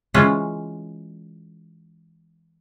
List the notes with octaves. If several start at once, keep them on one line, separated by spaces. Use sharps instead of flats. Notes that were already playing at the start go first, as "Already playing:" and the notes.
E3 G#3 C#4 F4